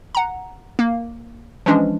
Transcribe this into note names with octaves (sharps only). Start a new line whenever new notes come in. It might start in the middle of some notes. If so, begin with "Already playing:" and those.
F#5 A#5
A#3
E3 F3 G#3 C#4 D4